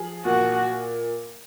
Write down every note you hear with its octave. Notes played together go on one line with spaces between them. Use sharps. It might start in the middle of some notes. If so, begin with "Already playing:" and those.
Already playing: F3 G#4
A#2 F#4